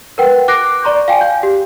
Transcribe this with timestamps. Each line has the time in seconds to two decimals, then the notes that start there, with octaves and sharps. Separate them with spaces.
0.18 A#4 B4 F#5 G5
0.48 D6 F#6 A#6 C7 D7
0.83 D5 A#5 C6 C#6 G6
1.08 F5 G5 G#5
1.21 G6
1.43 G4